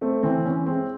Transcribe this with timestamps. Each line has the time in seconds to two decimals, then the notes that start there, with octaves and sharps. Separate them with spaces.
0.01 A3 C4
0.23 E3 C4
0.45 E3 C#4
0.66 G#3 C4